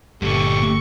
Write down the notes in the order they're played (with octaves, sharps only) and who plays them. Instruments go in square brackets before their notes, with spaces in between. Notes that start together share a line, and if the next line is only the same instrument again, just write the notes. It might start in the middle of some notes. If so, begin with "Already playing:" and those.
[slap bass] G1 [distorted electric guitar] G2 A#2 [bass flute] G4 [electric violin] A4 C#6